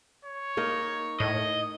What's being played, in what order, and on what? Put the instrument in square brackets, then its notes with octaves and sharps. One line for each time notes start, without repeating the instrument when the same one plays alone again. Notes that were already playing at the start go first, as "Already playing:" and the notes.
[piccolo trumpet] C#5
[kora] A#3 D#4 A#4
[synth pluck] A2 [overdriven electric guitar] D#5